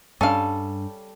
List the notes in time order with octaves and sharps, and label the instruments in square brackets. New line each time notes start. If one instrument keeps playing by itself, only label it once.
[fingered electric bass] G2 D4 [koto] G3 A4 [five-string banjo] C#4 F5 [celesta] A5